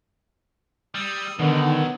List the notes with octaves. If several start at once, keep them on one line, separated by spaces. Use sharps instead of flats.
G3 D#6 E6
B2 D3 D#3 F#3 B3